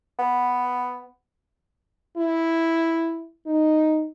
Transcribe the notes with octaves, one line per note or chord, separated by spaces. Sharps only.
B3
E4
D#4